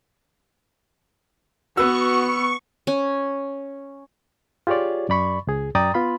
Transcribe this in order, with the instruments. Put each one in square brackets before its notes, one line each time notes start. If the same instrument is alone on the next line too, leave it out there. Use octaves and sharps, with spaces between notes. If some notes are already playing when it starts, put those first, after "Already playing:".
[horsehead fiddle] B3 [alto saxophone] F#4 [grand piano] B4 E6 [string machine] C#6
[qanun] C#4
[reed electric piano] F4 G4 G#4 C#5 D5
F#2 D5 B5 C#6
C#2 G#4
F#2 D5 G5 A#5 D#6 A6
B3 F4 B5 C6